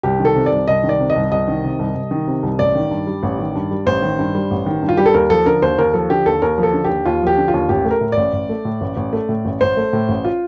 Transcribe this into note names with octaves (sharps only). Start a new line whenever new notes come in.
C2 G4
D#3
A4
C3
D5
C2
C2 D#5
D#3
D5
C3
D#5
C2
C2 D#5
D#3
C3
C2
C2
D#3
C3
C2
A1 D5
D#3
G2
G3
A1
D#3
G2
G3
A1 C5
D#3
G2
G3
A1
D#3
G2
F4
G3 G4
A4
D#2 A#4
F3 A4
D3 A#4
D#2 C5
D#2 A#4
F3 A4
D3 G4
D#2 A4
D#2 A#4
F3
A4
D3
D#2 G4
D#2 F4
F3 G4
D3
F4
D#2
A1 G4
A3
A#4
A2
A1 D5
A1
A3
A2
A1
A1
A3
A2
A1
A1 C5
A3
A2
A1
F4